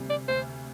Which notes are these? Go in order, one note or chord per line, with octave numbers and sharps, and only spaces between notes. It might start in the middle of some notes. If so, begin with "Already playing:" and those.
Already playing: D2 C3 G3
D5
D2 C5